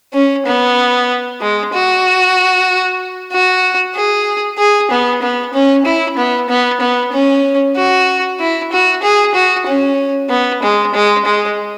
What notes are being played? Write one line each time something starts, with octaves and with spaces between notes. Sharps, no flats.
C#4
B3
G#3
F#4
F#4
G#4
G#4
B3
B3
C#4
E4
B3
B3
B3
C#4
F#4
E4
F#4
G#4
F#4
C#4
B3
G#3
G#3
G#3